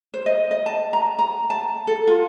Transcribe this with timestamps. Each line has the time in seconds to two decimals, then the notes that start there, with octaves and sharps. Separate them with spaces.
0.14 C5
0.26 D#5
0.51 D#5
0.66 A5
0.93 A#5
1.19 A#5
1.50 A5
1.87 A4
2.07 F4